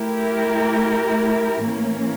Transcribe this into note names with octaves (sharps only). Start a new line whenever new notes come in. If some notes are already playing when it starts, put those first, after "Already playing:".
Already playing: A3 E4 G4 A#4
A2 E3 A#3 C#4